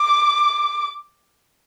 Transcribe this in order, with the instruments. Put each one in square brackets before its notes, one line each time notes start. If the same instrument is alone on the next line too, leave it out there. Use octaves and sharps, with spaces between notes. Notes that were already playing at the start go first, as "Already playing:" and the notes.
Already playing: [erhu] D6